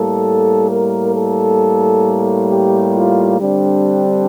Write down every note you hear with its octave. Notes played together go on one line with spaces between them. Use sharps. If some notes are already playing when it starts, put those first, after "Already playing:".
Already playing: A2 G3 A#3 A4
A#4
A4
G4
F4
D3 G3 C4 D4